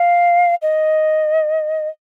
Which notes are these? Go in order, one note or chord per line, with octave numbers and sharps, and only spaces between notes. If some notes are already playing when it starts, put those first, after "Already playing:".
Already playing: F5
D#5